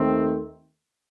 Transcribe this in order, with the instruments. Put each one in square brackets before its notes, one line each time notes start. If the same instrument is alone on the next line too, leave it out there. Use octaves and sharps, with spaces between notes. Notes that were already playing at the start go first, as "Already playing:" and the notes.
Already playing: [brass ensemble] D#2 D#3 A3 C4